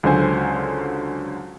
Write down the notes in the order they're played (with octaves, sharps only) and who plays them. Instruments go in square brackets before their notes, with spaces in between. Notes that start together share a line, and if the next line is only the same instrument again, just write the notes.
[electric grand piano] C#2 D3 F#3 C5 G#5